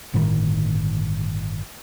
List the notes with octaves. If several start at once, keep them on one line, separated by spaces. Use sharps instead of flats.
G1 A2 D#3